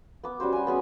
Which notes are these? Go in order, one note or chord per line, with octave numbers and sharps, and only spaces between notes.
B3 D6
G3 C#4 F#4 C5
F#5 G#5
B3 C#4 G#4